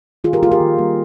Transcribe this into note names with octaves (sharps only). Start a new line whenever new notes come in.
D#3 F4 G#4
G4 A#4
G3 A#3 F4 G#4
G4 A#4
D#3
G3 A#3